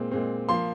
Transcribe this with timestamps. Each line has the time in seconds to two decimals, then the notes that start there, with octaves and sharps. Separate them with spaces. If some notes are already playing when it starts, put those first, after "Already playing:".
Already playing: A#2 G#3 C4
0.11 A#2 G#3 C4
0.48 F3 A#3 C6